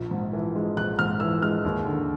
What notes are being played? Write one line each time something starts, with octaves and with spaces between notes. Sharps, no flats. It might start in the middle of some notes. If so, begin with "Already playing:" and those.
Already playing: A#1
G#2
E3
G#3
A#1 F#6
G#2 F6
E3 E6
G#3 F6
D#2
D3